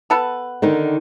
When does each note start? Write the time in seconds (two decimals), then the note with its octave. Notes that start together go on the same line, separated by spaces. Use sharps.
0.10 B3 A4 B4
0.62 D3 D#3 D#4